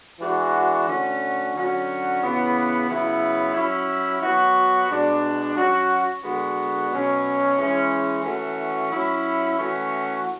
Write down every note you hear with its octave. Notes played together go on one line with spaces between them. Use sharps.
E3 G#3 D4 F#4
D3 A3 C#4 F#4
D3 F#3 C#4 F#4
C#3 E3 B3
C#3 F#3 B3 E4
F#3 C#4 E4
F#3 B3 F#4
B2 G#3 D4
F#3 C#4 F#4
D3 G#3 B3 F#4
B2 F#3 C#4
E3 G#3 C#4
E3 A3 C#4 F#4
F#3 C#4 E4
E3 A3 C#4 F#4